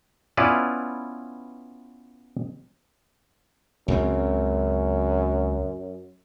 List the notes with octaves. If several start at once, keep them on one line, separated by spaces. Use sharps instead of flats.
B3 C#4 E4 F4 B4 D5
C#2 F#2 C#3 C4